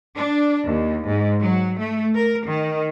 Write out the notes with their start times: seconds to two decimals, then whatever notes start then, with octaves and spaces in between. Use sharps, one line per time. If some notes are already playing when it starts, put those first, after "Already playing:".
0.15 D4
0.66 D#2
1.06 G#2
1.40 F#3
1.79 A3
2.14 A#4
2.46 D#3